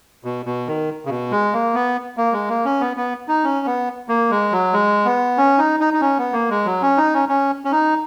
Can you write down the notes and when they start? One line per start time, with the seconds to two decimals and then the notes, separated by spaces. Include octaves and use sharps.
0.24 B2
0.46 B2
0.67 D#3
1.05 C#3
1.10 B2
1.32 G#3
1.53 A#3
1.74 B3
2.17 A#3
2.32 G#3
2.49 A#3
2.65 C#4
2.81 B3
2.97 B3
3.28 D#4
3.44 C#4
3.66 B3
4.09 A#3
4.31 G#3
4.52 F#3
4.73 G#3
5.05 B3
5.38 C#4
5.58 D#4
5.80 D#4
5.94 D#4
6.01 C#4
6.18 B3
6.33 A#3
6.50 G#3
6.65 F#3
6.82 C#4
6.97 D#4
7.14 C#4
7.29 C#4
7.65 C#4
7.72 D#4